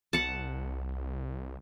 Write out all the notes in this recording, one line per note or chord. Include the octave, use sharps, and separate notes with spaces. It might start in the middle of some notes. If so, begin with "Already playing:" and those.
C2 F#5 A5